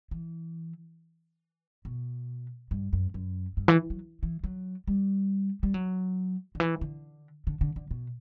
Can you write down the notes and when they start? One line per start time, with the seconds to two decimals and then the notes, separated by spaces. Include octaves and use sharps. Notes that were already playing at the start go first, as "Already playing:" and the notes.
0.11 E3
1.85 B2
2.71 G2
2.93 F#2
3.14 F#2
3.57 G2
3.68 E3
3.90 F#3
4.23 E3
4.44 F#3
4.87 G3
5.63 G3
5.74 F#3
6.55 D3
6.60 E3
6.81 D3
7.47 D3
7.61 D3
7.76 D3
7.91 B2